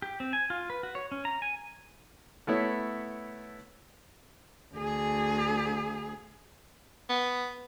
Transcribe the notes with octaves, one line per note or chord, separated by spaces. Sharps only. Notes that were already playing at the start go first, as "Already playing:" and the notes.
G4
C4
G#5
F4
B4
F#4
C#5
C#4
A#5
G#5
A3 B3 E4 C#5
D2 G#4
B3